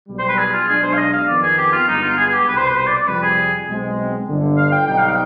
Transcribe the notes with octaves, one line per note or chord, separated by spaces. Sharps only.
B1 B2 G3
C5
B4
G#4
F4
B1 B2 G#3 D4 G#4
C5
F5
D#5
F5
F2 D#3 B3 D5
G#4
G4
F4
G2 D3 G#3 B3 D#4
F4
G#4
G#4
G4
C2 B2 G3 B4
C5
B4
C5
D5
D5
F2 C3 G3 B4
G#4
B1 B2 G#3 C4
G1 G2 D3
F5
G5
B1 B2 G3 C4 D#4 G5
F5
G5